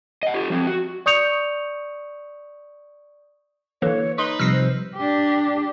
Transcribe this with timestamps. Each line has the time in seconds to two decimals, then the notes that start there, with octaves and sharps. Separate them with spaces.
0.23 D#5 F#5
0.34 F4 G4
0.50 F3 C4
0.67 F#4
1.06 D5 C#6 D#6 G6 C#7 F7
3.82 D3 E3 A#3 C#5
4.18 D#4 B4 C6 D#6
4.39 C3 F3 G3 E6 F6 A#6 C7
4.52 C5
4.96 D4 G4